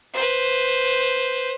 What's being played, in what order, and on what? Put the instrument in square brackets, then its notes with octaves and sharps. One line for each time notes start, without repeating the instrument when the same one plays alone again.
[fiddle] B4 C5